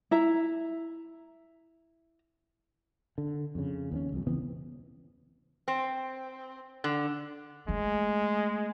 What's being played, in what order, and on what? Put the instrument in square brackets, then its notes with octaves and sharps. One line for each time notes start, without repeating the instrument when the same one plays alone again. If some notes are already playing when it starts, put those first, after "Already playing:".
[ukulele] E4 E5 A#5
[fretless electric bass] D3
F2 C#3
D#2 C4 C#4
C2 F2
C#3 E3 B3 C4
[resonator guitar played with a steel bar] C4
D3
[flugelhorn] G#3 [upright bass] A3 B3